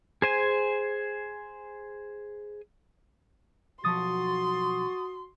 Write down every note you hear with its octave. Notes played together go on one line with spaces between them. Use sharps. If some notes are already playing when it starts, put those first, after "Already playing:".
G#4 C5 G#5
B1 F3 F#4 A5 C6 C#6 D#6 A6